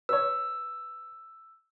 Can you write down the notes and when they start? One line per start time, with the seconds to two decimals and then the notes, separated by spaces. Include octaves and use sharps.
0.09 B4 C#5 E6